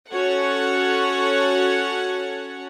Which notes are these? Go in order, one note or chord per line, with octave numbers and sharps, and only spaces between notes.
C#4 F#4 A4 C#5 F#5